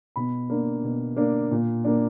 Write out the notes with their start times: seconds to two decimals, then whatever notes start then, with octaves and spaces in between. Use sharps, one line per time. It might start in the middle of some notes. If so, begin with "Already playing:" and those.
0.16 B2 B5
0.50 A#3 D4
0.84 B2
1.16 A#3 D4
1.51 A#2
1.84 A#3 D4